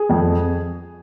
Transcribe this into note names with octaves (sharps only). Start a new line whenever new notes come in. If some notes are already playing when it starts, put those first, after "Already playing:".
Already playing: G#4
F2